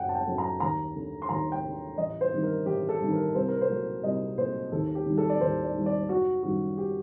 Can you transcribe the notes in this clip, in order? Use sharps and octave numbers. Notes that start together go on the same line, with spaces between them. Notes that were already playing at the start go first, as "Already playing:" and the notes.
Already playing: F#1 F#2 F#3 A3 F#5 G5
A5
G5
F#2 F#3 A3
A#5
D#2 A#5
D3 A3
C6
D#2 A#5
G5
D3 A3
A1 D#5
C5
G2 D#3
A#4
A1 G4
A4
G2 D#3
A#4
C2 C5
A#4
C5
A#2 F#3 A3
C2 D#5
A#2 F#3 A3 C5
D#2 A4
G4
D#3 G3
A4
D5
D#2 C5
D5
D#3 G3
D5
F#1 F#4
F#2 D#3 G3 F#4
G4